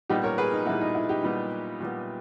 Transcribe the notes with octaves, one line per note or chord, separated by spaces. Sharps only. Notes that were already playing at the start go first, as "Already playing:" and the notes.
A#2 G3 B3 D#4 G4
A#4 C#5
G#4 B4
D#4
A#2 G3 B3 E4
D#4
E4
D#4 G4
A#2 G3 B3
A#2 G3 B3